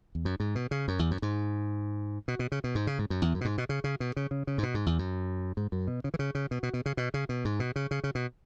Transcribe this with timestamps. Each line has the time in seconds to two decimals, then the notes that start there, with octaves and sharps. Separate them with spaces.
0.15 E2
0.25 F#2
0.40 G#2
0.55 B2
0.71 C#3
0.88 F#2
0.99 E2
1.11 F#2
1.22 G#2
2.28 B2
2.39 B2
2.52 C#3
2.64 B2
2.75 G#2
2.87 C#3
2.99 G#2
3.10 F#2
3.22 E2
3.34 F#2
3.41 B2
3.45 G#2
3.58 B2
3.69 C#3
3.84 C#3
4.00 B2
4.16 C#3
4.31 C#3
4.47 C#3
4.58 G#2
4.63 B2
4.74 G#2
4.86 E2
4.99 F#2
5.57 G#2
5.72 F#2
5.87 B2
6.04 C#3
6.14 E3
6.19 C#3
6.35 C#3
6.51 B2
6.63 B2
6.74 B2
6.86 C#3
6.97 B2
7.14 C#3
7.29 B2
7.45 G#2
7.60 B2
7.76 C#3
7.91 C#3
8.04 C#3
8.15 B2